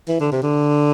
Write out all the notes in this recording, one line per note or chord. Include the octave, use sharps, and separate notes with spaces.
E3
D3
C3
D3